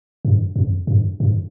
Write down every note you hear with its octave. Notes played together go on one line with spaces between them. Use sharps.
G2
F2
G2
G2